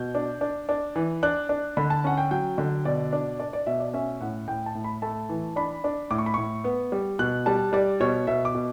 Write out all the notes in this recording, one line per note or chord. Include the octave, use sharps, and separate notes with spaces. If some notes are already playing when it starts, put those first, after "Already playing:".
Already playing: B2 G6
D4
D4
D4
E3
D4 F#6
D4
D3 B5
A5
C#4 F#5
G5
F#3 G5
D3
B2 D5
D4
D4 D5
D5
B2 E5
D5
C#4 E5
A2 F#5
A2 G5
A5
A2
B5
A3 A5
E3
D4 B5
D4
A2 D6
C#6
B5
A2 C#6
B3
G3
B2 F#6
G3 A5
G3 D5
B2 C#5
B2 E5
D6
B2